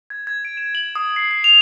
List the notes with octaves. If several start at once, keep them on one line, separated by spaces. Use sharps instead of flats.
G#6
G#6
D7
E7
F#7
D#6
C7
C7
F7